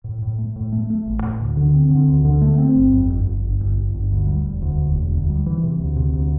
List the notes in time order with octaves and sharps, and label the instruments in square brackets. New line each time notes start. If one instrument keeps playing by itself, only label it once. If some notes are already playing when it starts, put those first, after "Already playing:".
[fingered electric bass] A2
A2
A3
A2
A3
A3
A1
A2
D2
D3
C4
D3
D2
D3
A3
C4
G1
F2
G1
G1
G1
G1
G1
G1
D2
G3
E1
D2
E1
E1
D2
G3
E3
C3
D2
C3
D2